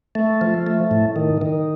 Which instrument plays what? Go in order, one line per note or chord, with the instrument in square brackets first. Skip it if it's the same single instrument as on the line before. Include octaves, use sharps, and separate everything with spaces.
[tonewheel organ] A3
F3
A3
A2
D#3
D#3